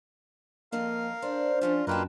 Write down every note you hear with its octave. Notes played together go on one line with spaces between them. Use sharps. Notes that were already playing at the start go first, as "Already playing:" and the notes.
F2 A#3 C4 A#4 D#5 F5
D4 C5
F3 C#4 D4 F4
F#2 A#3 F4 B4 D#5 G5 A5